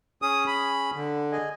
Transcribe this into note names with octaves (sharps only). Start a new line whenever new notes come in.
C#4 G#4 D#6
B5
D3
G#4 D#5 G#5